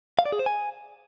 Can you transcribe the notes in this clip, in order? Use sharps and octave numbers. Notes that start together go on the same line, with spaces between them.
F5
D5
G#4
C5
G#5